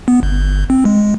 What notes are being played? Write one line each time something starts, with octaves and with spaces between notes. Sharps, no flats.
B3
G1
C4
G#3